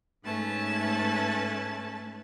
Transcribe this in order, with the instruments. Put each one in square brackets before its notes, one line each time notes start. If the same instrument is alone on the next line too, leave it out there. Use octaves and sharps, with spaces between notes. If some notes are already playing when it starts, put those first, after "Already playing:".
[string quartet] G#2 A3 C#4 B4 A5